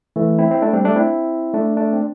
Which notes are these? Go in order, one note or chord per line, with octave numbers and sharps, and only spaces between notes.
E3 A3
C4 E4
C4
A3 D4
G3 C4
A3 D4
C4 E4
A3 D4
A3 D4
C4